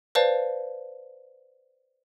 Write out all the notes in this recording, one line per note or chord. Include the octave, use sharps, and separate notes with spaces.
B4 C5 D5 F5 A5